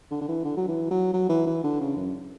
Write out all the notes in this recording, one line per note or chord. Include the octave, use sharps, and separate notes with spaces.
D3
D3
E3
D3
F#3
E3
F#3
F#3
E3
E3
D3
C#3
F#2